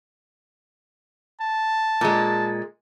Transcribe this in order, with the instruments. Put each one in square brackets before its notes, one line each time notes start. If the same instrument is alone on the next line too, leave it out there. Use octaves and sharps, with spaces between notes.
[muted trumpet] A5
[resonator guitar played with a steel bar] A#2 G#3